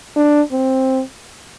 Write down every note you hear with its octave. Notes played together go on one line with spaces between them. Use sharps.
D4
C4